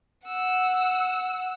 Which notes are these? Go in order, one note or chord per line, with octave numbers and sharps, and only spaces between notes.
F#5 E6